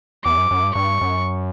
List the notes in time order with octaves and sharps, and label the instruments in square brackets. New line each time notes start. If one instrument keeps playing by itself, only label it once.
[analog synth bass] E2 [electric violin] D6
[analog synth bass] F#2
F#2
G2
[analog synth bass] G2 [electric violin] C#6
[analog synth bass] F#2